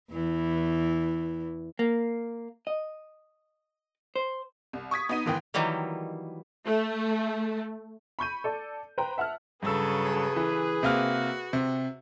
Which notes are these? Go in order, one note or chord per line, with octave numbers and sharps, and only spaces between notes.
E2 E3
A#3
D#5
C5
C2
C#6 D#6 G#6 B6
B3 D#4 D#7
E2 G#2 D#3 E3 B3 G5
D#3 E3 F#3 G3 A#3
A3
B5 C#6 G6 D#7
A4 D5 A5
B4 C5 G5 A#5
E5 F#5 A5 F6
G2 C#3 F#3 G#4 A4 B4 E6
E3
C3 A#3 F#4 F6
C3